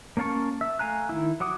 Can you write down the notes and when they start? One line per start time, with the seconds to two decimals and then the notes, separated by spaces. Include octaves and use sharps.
0.17 A#3 C#4 F5 A5 C#6
0.61 E5
0.79 A3 F5 G#5 A#5 F#6
1.09 D#3 E4
1.40 F#3 F#5 D6 D#6